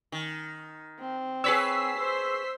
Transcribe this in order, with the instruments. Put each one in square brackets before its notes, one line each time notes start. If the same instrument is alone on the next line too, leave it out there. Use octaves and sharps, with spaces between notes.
[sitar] D#3
[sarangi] C4
[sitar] G#4 B4 C#5 [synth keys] E6 B6 C7
[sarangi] C5